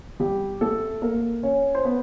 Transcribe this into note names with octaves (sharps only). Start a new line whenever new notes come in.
G3 G4
A3 A4
A#3 A#4
C#4 C#5
C5
B3 B4